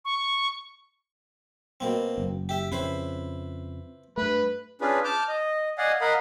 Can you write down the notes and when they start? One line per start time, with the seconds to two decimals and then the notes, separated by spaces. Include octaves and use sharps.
0.05 C#6
1.80 B2 A#3 C4
2.18 F#1
2.49 G4 E5
2.72 F2 C#3 E4 B4 C5
4.17 G2 A3 B4
4.81 C#4 D4 F4 G#4 B4
5.04 A5 D6 F6 G6
5.28 D#5
5.78 D5 D#5 F5 F#5 G#5
6.01 A#4 D#5 F5 F#5 B5